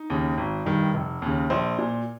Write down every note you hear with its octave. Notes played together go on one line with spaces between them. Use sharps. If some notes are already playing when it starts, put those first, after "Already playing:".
Already playing: D#4
D#2 C#3
G#1
G2 D#3
F1
D#2 C#3
A#1 C5
A#2